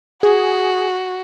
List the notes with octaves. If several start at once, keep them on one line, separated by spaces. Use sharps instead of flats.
F#4 G#4